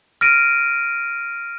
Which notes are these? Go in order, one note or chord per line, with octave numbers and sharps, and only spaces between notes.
F6 A#6 D7 D#7